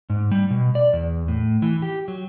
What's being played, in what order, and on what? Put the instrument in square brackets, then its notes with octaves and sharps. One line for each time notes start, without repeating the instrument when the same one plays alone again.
[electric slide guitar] G#2
G3
B2
D5
E2
A2
E3
G4
F#3